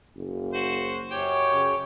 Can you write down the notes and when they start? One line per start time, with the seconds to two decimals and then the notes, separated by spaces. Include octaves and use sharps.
0.16 F#1
0.53 F#4 C5
1.11 F#2 G4 C#5 G5
1.52 C#3